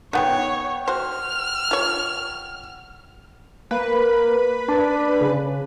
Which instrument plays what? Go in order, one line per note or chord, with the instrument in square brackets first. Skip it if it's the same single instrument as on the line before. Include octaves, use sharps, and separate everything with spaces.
[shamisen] B3 D#4 [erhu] C#5 [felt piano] F#5 G5
[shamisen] F#4 C5 [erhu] F6
[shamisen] F4 C#5
[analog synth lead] A#3 [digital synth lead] B4
[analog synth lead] D4
C#3